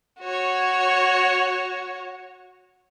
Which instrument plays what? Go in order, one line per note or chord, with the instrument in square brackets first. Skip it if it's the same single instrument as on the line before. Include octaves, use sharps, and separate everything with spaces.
[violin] F#4 C#5